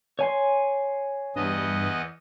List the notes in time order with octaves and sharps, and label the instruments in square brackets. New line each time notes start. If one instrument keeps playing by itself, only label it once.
[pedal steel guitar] C#5 G#5 C6
[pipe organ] E2 B3 D#5 [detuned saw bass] G2